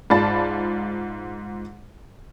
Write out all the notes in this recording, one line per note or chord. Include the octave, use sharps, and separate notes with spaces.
G#2 F4 D5 A5 B5 A6